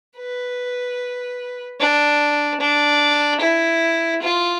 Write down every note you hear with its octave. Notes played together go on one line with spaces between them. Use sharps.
B4
D4
D4
E4
F4